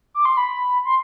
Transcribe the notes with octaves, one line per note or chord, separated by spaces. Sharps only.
D6
C6
B5
C6